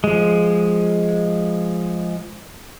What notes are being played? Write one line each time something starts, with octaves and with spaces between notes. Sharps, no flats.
F3 G#3